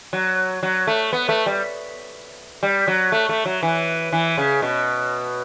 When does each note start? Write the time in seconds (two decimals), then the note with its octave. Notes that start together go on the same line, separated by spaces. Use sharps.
0.13 F#3
0.63 F#3
0.87 A3
1.13 B3
1.29 A3
1.46 G3
2.63 G3
2.88 F#3
3.12 A3
3.29 A3
3.46 F#3
3.63 E3
4.13 E3
4.38 C#3
4.62 B2